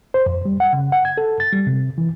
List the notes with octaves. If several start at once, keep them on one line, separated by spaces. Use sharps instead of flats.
C5
F2
G3
F#5
C#3
F#5
G#6
A4
A6
G3
C3
E3